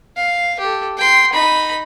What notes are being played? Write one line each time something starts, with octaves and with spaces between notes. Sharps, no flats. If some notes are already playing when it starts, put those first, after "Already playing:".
F5
G4 A4
G5 C6
D#4 B5